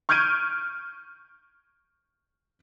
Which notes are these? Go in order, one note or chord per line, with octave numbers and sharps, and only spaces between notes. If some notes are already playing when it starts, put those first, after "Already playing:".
C#6 F6 G6 G#6 D7 D#7